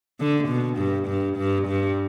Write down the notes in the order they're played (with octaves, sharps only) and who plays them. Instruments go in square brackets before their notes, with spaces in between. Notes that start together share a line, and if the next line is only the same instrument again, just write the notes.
[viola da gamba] D3
B2
G2
G2
G2
G2